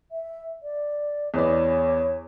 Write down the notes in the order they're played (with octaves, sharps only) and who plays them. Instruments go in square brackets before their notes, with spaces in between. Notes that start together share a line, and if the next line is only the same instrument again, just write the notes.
[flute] E5
D5
[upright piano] E2 B4 D5 [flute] C#5